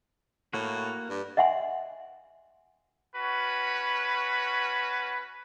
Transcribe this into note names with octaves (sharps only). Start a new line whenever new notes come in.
A2 A#3 F#4
G2
D#5 E5 F#5 G#5 C6
C#4 F#4 B4